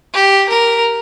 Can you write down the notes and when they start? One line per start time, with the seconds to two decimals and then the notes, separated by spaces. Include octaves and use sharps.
0.14 G4
0.49 A#4